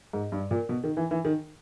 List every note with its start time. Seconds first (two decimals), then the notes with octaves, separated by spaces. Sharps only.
0.13 G#2
0.32 G2
0.51 A#2
0.69 B2
0.83 D#3
0.97 E3
1.11 E3
1.25 D#3